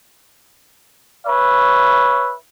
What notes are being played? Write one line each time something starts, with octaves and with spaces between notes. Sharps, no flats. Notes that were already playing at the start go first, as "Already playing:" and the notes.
B4 C#5 E5